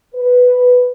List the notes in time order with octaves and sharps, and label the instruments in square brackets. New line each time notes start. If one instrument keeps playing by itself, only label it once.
[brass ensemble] B4